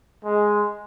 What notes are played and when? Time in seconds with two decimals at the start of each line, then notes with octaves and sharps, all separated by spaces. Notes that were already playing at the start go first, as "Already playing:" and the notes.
0.24 G#3